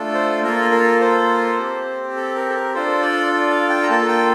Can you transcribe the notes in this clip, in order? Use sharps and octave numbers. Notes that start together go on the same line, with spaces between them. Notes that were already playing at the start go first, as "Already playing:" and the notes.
Already playing: A3 D4 F4 A4
C5
A#3 F4 A4 A#4
A#4
C5
C4 G4
A4
A#4
A4
A#4
D4 F4 A4 C5
D5
F5
G5
A#5
A#3 F4 A4 A5
G5